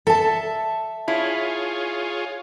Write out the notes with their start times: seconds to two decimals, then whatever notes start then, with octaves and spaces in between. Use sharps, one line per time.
0.07 A4 E5 A5
1.08 E4 F4 G#4 C#5